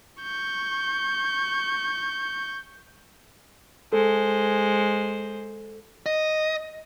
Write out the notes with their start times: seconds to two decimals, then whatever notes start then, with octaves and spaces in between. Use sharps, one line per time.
0.22 C#6 G6
3.93 G#3 A4 C5
6.06 D#5